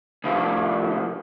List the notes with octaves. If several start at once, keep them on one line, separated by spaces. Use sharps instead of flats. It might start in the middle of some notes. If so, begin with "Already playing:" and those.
C2 F2